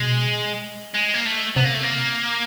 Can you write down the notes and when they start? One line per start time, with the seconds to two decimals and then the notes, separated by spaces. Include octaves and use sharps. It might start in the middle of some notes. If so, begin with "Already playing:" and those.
Already playing: B2 G#3
0.94 G#3
1.14 A#3
1.26 A3
1.56 C3 B3
1.65 A#3
1.74 A3
1.83 A#3